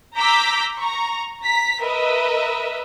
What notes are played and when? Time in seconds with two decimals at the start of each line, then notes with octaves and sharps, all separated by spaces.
0.17 A#5 D6 E6 G6 B6
0.78 A#5 C#6
1.44 A#5 B6
1.83 A#4 B4 D#5 E5